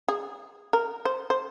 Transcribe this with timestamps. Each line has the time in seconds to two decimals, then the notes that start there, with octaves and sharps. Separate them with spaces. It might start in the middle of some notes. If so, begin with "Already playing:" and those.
0.08 G#4
0.73 A#4
1.05 C5
1.30 C5